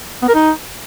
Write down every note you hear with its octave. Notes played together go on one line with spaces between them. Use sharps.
B3
A#4
D#4